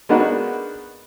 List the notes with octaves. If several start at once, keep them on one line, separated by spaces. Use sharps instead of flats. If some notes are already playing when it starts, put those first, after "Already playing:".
G#3 A#3 B3 D4 D#4 F#4